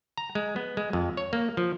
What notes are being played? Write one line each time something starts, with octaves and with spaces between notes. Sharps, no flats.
A#5
G#3
B3
G#3
F2
C#5
A#3
F3